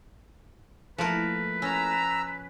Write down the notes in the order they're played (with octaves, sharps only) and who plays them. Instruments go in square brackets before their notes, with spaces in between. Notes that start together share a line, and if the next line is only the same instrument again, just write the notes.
[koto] F3 A#4 [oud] A3 A#3 E4 [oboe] B4
[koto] C#4 [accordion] A#5 E6